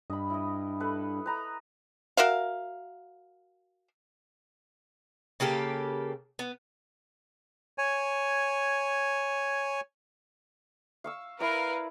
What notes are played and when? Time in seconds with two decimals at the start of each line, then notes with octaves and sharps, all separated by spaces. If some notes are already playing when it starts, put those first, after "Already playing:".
0.10 G2 D#5 B5
0.30 E4 D#5
0.80 A4 B4
1.26 B4 A#5 D#6
2.17 F#4 A#4 E5 F5
5.40 C#3 A#3 G4 A4
6.39 B3
7.78 C#5 G#5
11.04 F5 C#6 E6
11.40 E4 A#4 B4 D5 F5 A#5